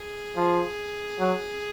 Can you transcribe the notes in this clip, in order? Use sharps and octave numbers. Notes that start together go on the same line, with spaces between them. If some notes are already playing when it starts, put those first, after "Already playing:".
Already playing: G#4
F3
F#3